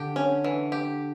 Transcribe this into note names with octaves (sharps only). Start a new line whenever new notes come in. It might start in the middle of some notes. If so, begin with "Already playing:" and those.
Already playing: D3 G4
C#4
E3
G4